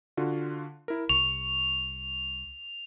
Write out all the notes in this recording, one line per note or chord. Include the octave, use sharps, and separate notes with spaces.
D3 F4 F#4
E4 A#4
C2 C#6 F7